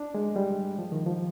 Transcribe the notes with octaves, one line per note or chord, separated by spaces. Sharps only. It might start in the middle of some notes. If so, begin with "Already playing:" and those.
Already playing: D4
G#3
G3
F3
D#3
F3